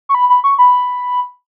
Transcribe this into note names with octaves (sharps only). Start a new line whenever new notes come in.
C#6
B5
B5
C#6
B5